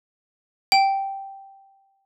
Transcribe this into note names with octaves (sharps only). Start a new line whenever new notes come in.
G5